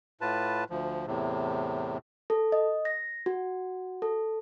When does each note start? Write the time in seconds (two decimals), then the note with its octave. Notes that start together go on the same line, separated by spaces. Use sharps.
0.21 A2 F4 B4 A5
0.70 D2 F3
1.07 E2 A2 C3
2.30 A4
2.52 D#5
2.85 A#6
3.26 F#4
4.02 A4